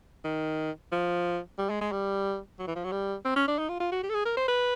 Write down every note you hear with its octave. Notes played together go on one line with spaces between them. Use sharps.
D#3
F3
G3
G#3
G#3
G3
F#3
E3
F3
F#3
G3
C4
C#4
D4
D#4
F4
F4
F#4
G4
A4
G#4
A#4
C5
B4